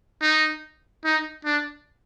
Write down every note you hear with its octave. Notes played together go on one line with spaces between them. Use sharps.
D#4
D#4
D4